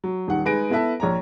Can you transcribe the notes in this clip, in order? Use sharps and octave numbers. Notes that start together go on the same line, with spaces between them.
F#3
D#1 D#3 F#5
G#3 D#4 B4 G#5 A#6 D7
B3 E4 A4 B4 E5 A5
A#1 C#5 A#5